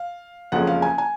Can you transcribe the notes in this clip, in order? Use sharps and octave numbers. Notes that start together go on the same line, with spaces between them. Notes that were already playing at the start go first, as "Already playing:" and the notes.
Already playing: F5
F#1 F2 F3 G#3 C#4 F#5
F5
G#5
G#5